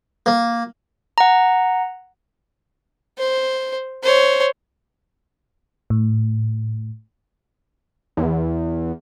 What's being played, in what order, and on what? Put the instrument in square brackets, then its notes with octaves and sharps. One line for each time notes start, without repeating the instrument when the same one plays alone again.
[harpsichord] A#3
[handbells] F#5 A#5
[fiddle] C5
C5 C#5
[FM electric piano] A2
[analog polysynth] E2